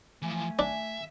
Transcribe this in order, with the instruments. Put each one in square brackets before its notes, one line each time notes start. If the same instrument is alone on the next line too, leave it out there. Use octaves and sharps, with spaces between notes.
[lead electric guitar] E3 F3 [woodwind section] A3 G#5
[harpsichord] D4 [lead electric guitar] E5